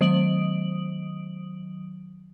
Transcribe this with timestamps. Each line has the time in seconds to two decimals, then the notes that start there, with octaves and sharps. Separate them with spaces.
0.01 D#3 F#3 D#6 D7 F#7